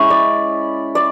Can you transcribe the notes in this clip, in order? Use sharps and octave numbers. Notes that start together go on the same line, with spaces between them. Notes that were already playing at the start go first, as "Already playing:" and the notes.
Already playing: G#3 C#4 E4
D5
D5